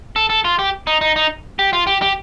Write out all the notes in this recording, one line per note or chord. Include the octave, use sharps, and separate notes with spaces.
A4
A4
F4
G4
D#4
D#4
D#4
G4
F4
G4
G4